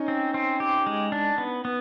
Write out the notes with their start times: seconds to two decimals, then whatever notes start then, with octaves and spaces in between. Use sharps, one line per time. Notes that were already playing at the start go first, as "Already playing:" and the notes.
Already playing: C#4 D#4
0.08 C4
0.34 C4
0.60 G4
0.86 G#3
1.12 D4
1.38 B3
1.65 B3